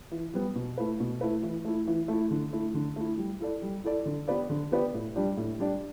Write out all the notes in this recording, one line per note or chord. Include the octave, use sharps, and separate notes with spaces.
E3
G3 B3
B2
A3 E4 B4
B2
A3 E4 B4
E3
A3 E4
E3
A3 E4
D3
A3 E4
D3
A3 E4
G3
E4 A4 D5
G3
E4 A4 D5
D3
B3 G4 B4 D5
D3
B3 G4 B4 D5
A2
G3 D4 G4 D5
A2
G3 D4 G4 D5